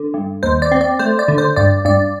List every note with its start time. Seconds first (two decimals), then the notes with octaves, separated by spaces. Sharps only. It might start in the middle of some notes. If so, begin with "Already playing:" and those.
Already playing: D3
0.14 G2
0.43 D#2 C5
0.62 D5
0.72 C4
0.81 D5
0.99 A3 C5
1.19 D5
1.28 D3
1.38 C5
1.56 G2 D5
1.85 G2 D5